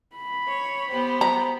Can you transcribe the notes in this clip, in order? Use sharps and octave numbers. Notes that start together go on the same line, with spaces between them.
B5
C#5
B3 G4 C5
A#5